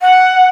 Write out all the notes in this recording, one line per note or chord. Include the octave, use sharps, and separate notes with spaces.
F#5